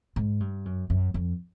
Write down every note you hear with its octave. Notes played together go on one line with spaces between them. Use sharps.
G#2
G2
F#2
F#2
F2